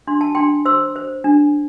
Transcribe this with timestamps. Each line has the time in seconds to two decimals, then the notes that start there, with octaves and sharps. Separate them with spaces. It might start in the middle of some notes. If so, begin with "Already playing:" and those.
0.07 D4 C6
0.21 A5
0.35 D4 G5 C6
0.65 C5 C6 E6
0.96 C5
1.24 D4